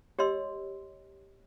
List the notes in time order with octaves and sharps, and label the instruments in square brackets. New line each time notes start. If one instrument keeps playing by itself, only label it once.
[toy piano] G4 C#5 D#5 C6 E6